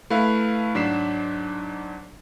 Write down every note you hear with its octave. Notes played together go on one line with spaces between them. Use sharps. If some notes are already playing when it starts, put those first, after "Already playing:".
A3 E4 B4 F5
G#2 F#3 D4 B6 C7 E7